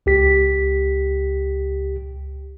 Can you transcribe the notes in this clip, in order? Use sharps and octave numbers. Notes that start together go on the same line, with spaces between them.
C#2 G4 B6